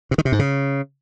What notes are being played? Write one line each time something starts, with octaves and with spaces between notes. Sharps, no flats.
C3
D#3
C3
G#2
C#3